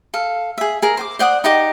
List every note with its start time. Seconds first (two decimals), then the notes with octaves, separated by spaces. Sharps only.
0.14 A4 F5
0.58 G#4 E5
0.82 G#4 A#4
0.97 C5 G5 D6
1.19 C5 D5 F#5 D#6
1.44 D#4 G4 D#5 D6